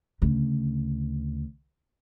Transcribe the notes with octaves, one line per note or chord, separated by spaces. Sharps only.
D2 C#3